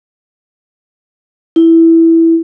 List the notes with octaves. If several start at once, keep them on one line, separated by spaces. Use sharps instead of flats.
E4